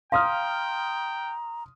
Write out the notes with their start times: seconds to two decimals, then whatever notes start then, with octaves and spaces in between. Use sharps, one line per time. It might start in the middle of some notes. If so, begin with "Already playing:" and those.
0.12 F5 G5 A#5 C6 D#6 F6